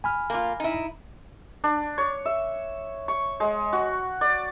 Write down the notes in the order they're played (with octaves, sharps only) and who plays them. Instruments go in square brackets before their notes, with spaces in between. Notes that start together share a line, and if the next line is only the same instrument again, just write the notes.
[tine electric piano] G#5 B5 F6
[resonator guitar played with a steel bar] A#3 F4
D#4 E4
[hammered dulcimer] D4
C#5
E5
C#6
G#3
F#4
D5